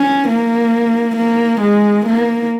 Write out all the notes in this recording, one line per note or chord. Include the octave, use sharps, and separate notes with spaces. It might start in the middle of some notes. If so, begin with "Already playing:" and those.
Already playing: C#4
A#3
A#3
G#3
A#3